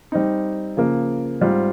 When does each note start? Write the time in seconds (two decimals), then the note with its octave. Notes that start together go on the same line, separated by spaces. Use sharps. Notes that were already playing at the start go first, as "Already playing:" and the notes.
0.12 G3 C4 D#4
0.77 C#3 F3 A#3
1.41 G#2 G3 C4 F4